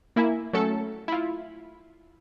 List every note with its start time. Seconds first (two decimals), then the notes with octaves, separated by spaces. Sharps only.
0.16 A#3 E4 E5 G#5
0.53 F#3 A3 C#4 A4 C#7
1.08 E4 F4